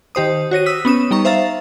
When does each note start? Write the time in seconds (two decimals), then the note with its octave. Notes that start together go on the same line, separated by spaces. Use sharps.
0.15 D#3 G4 C5 D#6
0.51 F#4 C#5 A#6 D#7
0.66 D#6 E6 F#6 B6
0.85 B3 C#4 D#6 E7
1.11 G3 D#4 A#5 C#6
1.25 C5 E5 F5 A#5 A6